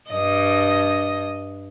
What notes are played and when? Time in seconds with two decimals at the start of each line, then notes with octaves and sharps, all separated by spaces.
0.10 G2 D#5